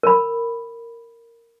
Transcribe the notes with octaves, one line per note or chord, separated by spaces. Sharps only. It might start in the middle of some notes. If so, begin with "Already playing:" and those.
A#4 B5